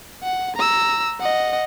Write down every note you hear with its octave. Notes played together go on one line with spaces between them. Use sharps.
F#5
A#5 E6
D#5 F#5